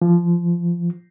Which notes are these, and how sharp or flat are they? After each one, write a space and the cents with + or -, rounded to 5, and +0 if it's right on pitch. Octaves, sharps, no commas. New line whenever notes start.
F3 -20